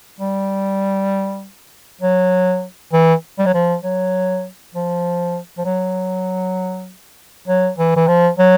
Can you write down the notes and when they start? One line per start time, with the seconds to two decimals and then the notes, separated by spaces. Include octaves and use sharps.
0.20 G3
2.02 F#3
2.93 E3
3.39 G3
3.46 F#3
3.54 F3
3.84 F#3
4.75 F3
5.58 F3
5.65 F#3
7.48 F#3
7.78 E3
7.96 E3
8.08 F3
8.39 F#3